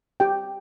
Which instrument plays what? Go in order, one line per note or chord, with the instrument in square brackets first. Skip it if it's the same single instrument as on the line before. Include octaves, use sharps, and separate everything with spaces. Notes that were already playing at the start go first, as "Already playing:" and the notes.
[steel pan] G4 G5